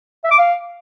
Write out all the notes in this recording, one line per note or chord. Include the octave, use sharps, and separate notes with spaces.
E5
D6
F5